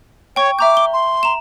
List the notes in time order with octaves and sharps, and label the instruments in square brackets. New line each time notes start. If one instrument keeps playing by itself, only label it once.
[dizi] C#5 [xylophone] G5 C#6
[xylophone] E5 A#5 G6 [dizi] D6
[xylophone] G7
[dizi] C6
[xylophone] A#5 E7